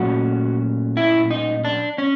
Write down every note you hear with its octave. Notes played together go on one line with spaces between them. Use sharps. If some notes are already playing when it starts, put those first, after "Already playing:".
Already playing: A#2 F#3 A3 C#4 F#4
E4
D#4
D4
C#4